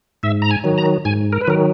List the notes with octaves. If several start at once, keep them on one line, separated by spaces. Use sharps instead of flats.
G#2 E5
A#5
G#5
D#3 F#3
A#5
G#2 G#5
A#4
B4
D#3 F#3 A#4